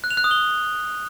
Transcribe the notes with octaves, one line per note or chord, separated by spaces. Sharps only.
F#6
F7
F#6
D#6
G7